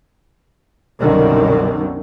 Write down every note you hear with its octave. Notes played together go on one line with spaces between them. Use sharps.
C2 F#2 B2 D3 D#3